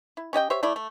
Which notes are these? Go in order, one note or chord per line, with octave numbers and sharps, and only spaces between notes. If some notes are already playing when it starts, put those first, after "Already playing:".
E4
C#4 G4 D#5 G5
G4 C5 C#5 E5
A3 E4 D5
A3